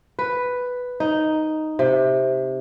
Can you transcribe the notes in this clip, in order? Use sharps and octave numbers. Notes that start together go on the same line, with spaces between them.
B4
D#4
C3